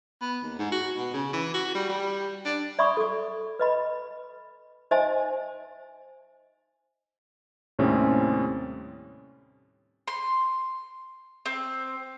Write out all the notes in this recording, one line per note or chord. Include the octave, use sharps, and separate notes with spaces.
B3
D#2
G#2
F#4
B2
C#3
E3
F#4
G3
G3
D4
D5 E5 B5 C#6 D#6
A4 D6
B4 D#5 B5
D#4 C5 D#5 E5 G#5 A5
D#2 A2 C3 G3 C4 C#4
C6
C4